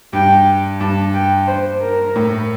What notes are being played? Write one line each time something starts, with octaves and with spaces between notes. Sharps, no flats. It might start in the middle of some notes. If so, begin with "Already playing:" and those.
G2 G5
G2 A5
G5
C5
A#4
A2